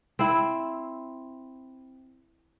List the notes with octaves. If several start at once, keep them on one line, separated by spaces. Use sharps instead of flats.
C4 E4